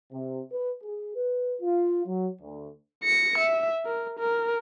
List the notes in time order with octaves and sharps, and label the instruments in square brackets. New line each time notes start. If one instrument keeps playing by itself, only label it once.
[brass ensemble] C3
B4
G#4
B4
F4
F#3
D2
[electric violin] A#6 C#7
E5
A#4
A#4